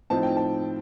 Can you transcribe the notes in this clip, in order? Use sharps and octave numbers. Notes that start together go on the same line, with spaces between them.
A2 F3 C4 D#4 A5
G5
A5